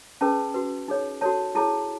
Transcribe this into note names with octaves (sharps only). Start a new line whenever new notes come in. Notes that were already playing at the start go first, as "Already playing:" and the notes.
C#4 G#4 B4 A5
F#4 B4
D#4 G#4 C#5
F#4 A4 C#5 A5
E4 G#4 C#5 A5